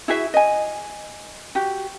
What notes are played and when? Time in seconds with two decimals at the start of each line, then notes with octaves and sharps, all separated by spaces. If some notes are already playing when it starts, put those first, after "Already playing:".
0.08 E4 F#4 G#4 E5
0.34 D#5 G#5
1.55 F#4 G4